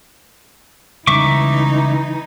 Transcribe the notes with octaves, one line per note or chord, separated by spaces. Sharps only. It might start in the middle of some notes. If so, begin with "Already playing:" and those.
C#3 E3 G3 G#3 D#4 E5 C#6 D6